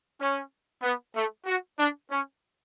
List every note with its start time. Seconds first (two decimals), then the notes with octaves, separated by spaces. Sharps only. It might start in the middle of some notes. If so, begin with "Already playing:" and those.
0.20 C#4
0.83 B3
1.15 A3
1.46 F#4
1.78 D4
2.10 C#4